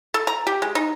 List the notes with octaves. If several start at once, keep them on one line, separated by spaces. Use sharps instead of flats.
A4
A#5
G4
G#3
D#4